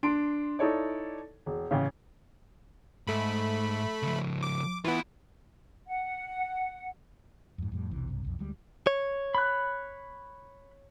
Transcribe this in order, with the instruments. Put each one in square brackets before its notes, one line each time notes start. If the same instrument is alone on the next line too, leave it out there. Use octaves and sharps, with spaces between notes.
[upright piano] D4 C6 D7
D#4 E4 A4 C#5 D5
E1
A1 C#3
[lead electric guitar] G#2 [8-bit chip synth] A3 B5
[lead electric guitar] C#3 F3
[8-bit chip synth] D6
[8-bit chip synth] E3 B3 [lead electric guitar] F4 B5
[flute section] F#5
[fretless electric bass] F2 G#2
F2 A2 G3
E1 B1 C3 E3
B1 G2 C3
B1 F2
D2 G3 G#3
[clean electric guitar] C#5
[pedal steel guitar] B5 F#6